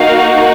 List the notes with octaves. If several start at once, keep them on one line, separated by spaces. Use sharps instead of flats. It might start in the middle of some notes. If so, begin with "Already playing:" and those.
Already playing: A#3 D#4 F#4 F5